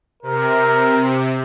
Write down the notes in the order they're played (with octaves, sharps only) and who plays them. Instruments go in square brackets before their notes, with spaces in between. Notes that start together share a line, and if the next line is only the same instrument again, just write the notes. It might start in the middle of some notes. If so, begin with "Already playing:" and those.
[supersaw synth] C3 [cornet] A#4